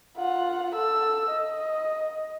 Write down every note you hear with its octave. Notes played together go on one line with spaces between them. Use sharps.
F4 F#5
A4 E6
D#5